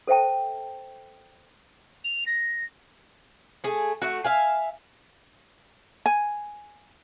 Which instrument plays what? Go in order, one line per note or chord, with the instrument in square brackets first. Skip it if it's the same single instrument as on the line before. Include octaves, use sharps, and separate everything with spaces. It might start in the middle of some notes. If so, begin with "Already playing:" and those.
[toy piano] A4 C5 E5 G5 A5
[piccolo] F7
A#6
[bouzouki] A3 G#4
A3 F#4
E5 F5 G#5
[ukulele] G#5